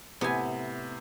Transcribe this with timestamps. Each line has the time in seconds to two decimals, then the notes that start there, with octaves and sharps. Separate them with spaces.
0.21 A2 C3 B3 G#5